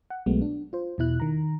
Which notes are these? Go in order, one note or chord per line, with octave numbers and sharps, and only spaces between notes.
F#5
B1 F#3 G#3 A3 B3
D4
F4 C5
E2 B2 E4 F#6
D#3 A#5